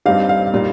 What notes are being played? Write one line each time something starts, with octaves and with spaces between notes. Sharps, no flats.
G2 G3 C4 D#4 G4 F5
F5
A#2 G3 D#4